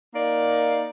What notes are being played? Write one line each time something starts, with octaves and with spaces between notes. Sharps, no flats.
A#3 D#4 A#4 D5